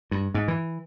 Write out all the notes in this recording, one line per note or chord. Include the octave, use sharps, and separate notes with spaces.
G2
G#2
E3